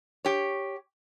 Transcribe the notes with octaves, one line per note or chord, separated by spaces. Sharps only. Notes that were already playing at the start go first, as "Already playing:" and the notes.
G4 C#5